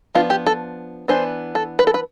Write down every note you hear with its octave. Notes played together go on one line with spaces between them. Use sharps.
F3 B3 D4 F4
G4
A4
E3 B3 D4 C5
A4
B4
A4
B4